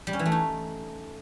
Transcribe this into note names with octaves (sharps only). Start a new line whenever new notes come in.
G3
C#4
E3
A3
D#4